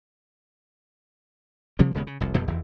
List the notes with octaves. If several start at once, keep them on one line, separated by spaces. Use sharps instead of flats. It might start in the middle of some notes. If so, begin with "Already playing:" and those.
C3 F3 G3 A#3
D#1 C#3 G#3 B3
C#3
F1 C2
F1 F2 B2 G3
F1 E2 E3